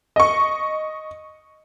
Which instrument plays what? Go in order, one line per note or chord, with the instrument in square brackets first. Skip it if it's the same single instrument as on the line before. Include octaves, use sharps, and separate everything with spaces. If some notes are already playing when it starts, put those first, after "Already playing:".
[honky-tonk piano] D#5 C#6